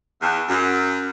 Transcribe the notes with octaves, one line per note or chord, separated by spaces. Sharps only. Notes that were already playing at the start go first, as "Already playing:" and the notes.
E2
F#2